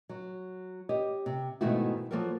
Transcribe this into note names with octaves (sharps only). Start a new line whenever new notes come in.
F#3
G4 C#5 D#5
C3
G#2 B2 D#3 A3 E4 F#4
F3 F#3 A#3 F#4 A4 A#4